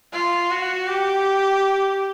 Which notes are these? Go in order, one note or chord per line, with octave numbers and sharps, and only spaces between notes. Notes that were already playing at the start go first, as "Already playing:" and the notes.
F4
F#4
G4